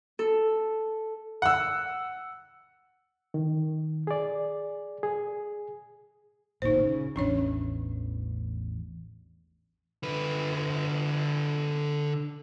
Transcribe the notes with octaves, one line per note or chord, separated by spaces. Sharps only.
A4
F#5 E6
D#3
G#4 D5
G#4
D1 G#1 A#2 D#4 C5
C#3
A1 E2 C#4 D4 C#5
D3 B4